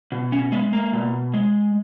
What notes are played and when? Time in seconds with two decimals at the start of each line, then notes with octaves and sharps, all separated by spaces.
0.12 B2
0.32 C#4
0.52 G#3 B3
0.73 A#3
0.93 B2
1.34 G#3